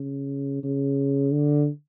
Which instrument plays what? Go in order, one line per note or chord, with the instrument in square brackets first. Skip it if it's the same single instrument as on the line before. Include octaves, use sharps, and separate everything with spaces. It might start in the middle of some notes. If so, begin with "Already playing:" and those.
Already playing: [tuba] C#3
C#3
D3